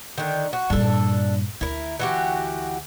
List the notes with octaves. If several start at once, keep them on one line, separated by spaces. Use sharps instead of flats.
D3 D#3
F#4
G2 A#2 D4 A4
D2 E4 A#4
E3 F#4 G4